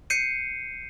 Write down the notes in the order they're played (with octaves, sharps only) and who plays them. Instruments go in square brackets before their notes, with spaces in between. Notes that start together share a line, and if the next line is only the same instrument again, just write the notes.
[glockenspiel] G6 C7 C#7 D#7